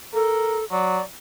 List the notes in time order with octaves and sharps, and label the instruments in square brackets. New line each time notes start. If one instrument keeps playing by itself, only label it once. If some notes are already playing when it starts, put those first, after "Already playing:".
[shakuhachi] A4 [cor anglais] A#4
[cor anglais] F#3 [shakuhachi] D5